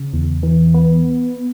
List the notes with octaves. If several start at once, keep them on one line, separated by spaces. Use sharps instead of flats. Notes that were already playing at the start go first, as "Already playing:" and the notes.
Already playing: C#3
E2
E3
B3